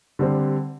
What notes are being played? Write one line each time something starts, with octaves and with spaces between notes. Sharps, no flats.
D3 G3 C4